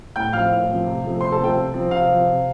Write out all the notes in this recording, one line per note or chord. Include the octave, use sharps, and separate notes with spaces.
A2 G5 G6
F3 C4 F5 F6
A2
F3 C4
C3
F3 A3 C4
C3 C5 C6
A4 A5
F3 A3 C4 G5
C3
F3 C4
C3 F5
F3 C4
C3